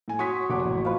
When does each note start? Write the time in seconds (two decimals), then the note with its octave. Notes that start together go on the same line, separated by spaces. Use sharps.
0.08 A2 G#5
0.19 F#4 C#5 C6 C#6 D#6 B6
0.50 F1 F#5 D6
0.65 A1
0.85 F3 B4